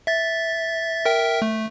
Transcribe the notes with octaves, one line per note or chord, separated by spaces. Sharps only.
E5 A6
A#4 E5 G5
A3